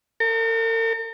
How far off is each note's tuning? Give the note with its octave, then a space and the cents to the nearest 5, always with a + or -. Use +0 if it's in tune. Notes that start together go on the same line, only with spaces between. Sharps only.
A#4 -45